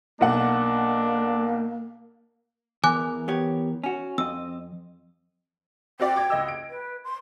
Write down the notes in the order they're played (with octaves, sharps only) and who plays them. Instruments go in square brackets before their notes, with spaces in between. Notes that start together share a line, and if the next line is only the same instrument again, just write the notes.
[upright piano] B1 F#5 [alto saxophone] A#3 [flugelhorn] D4
[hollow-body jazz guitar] E2 [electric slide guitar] E3 A#4 [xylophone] G#5 D6 F#6
[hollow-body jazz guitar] B3 G4 C#5
C#4 F#4
[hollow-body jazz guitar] F2 [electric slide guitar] C4 D#5 [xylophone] E6
[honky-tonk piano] C4 F#4 D5 [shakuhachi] G5
[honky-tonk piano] D6 G#6
C#2 D#5 E6
D7
[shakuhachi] B4
C6